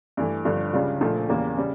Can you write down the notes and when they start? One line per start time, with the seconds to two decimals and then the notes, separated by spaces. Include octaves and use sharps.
0.17 G2 E3 A3
0.45 G1 G2 D3 F3
0.73 C#2 C#3 G3 D4 F4
1.01 A#1 A#2 F3 A3
1.29 E2 C#3 G3 A#3
1.57 C#3 G3